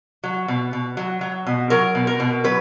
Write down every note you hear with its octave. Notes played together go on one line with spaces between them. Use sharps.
F#3
B2
B2
F#3
F#3
B2
F#3 A#4
B2
A#4
B2
F#3 B4